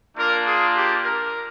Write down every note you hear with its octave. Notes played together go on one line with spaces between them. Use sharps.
A#3 D4 F4 A#4
G#4
G4
A#4